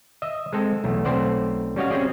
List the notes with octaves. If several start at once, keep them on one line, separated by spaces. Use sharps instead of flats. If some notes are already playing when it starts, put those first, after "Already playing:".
D#5 E5
G#3 C4 A4
B1 E2 A3
B1 A3 C4 C5 D5 F#5
G3 C#4 F#4 D#5 F5
C4 C#4 G#4 D5